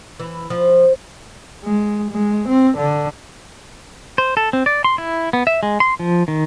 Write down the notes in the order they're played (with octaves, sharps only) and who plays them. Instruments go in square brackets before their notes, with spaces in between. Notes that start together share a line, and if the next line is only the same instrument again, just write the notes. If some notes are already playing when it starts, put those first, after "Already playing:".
[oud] E3
F3
[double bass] G#3
G#3
C4
D3
[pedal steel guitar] C5
A4
C4
D5
C6
E4
B3
E5
G#3
C6
F3
D#3